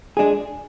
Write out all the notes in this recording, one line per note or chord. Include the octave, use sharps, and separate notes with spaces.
G#3 D4 G#4